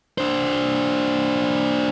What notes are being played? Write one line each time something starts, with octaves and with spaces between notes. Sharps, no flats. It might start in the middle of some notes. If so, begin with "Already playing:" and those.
D4 C5